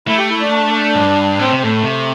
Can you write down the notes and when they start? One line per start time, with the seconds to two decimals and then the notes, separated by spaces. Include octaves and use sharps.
0.08 A3 E4
0.19 G4
0.30 E4
0.40 D4
0.95 G2
1.39 A2 C4
1.51 C3
1.62 A2 A3
1.83 C3